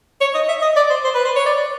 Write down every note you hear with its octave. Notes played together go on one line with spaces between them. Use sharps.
C#5
D#5
E5
D#5
D5
C5
C5
B4
C5
C#5
D5